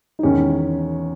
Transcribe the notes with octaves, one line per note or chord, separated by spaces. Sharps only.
D#4
E1 E2 D#3 C#4